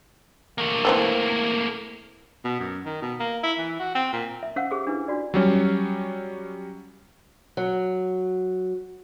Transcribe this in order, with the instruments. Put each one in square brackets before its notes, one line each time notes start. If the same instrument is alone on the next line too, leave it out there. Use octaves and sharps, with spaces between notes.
[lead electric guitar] A3 A#3
[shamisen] E3 C4 A4
[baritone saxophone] B2
F#2
D#3
B2
A#3
E4
E3
F#4
C4
A#2
[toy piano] E5
C#4 C5 F5 F#5 C#6 E6
G4 G#4 C5 D6
D4 E4 B4
D4 F4 F#4 D5
[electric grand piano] F#3 G3 C#4
[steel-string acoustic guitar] F#3